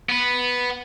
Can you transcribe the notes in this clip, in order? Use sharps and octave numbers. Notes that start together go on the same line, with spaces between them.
B3 B4